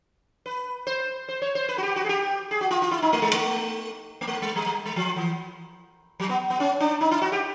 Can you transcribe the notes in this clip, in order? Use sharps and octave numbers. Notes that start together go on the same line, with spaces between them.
B4
C5
C5
C#5
C5
B4
F#4
G4
F#4
G#4
G4
G#4
F#4
F4
F4
E4
D#4
A3
G#3
A3
A#3
A3
G#3
G3
G3
G#3
F3
E3
F#3
B3
B3
C#4
D4
D#4
E4
F#4
G4